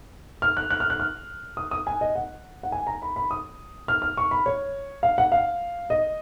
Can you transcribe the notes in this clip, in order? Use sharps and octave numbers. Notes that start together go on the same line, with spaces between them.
F6
F#6
F#6
F6
F#6
F6
D#6
D#6
G#5
D#5
F#5
F#5
G#5
A#5
B5
B5
D#6
F6
F6
C#6
B5
C#5
F5
F#5
F5
D#5